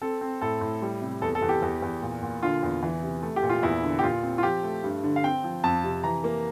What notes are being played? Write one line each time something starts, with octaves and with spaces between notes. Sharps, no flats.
C4 A4
C4
A2 A4
A2
G3
C3
E2 A4
A4
E2
G4
E2
E2
A#2
A#2
D3 F4
E2
E3
C3
A3
G4
A#2
F4
E2 E4
D3
G4
A#2 F4
C4
F4
F3 G4
A3
G2
D3
F5
C4 G5
F3
F2 A5
C3
E3 A#5
A#3